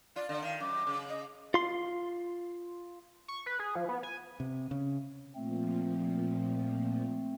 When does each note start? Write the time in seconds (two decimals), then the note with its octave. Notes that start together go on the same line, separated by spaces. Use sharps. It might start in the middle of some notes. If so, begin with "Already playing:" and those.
0.16 F4 D5
0.29 D3
0.42 D#3 F5
0.60 F#2 D6
0.87 C#3
1.09 D#5
1.54 F4 C6
3.28 C#6
3.46 B4
3.59 G#4
3.75 F3
3.89 B3
4.03 G#5
4.40 C3
4.71 C#3
5.36 A#2 F3 A3 C4